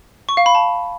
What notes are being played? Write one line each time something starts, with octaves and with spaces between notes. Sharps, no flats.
C#6
F5
B5
A5